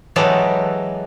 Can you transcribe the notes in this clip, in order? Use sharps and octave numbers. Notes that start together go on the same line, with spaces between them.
E3 F#3 G#3 B3 G4 A4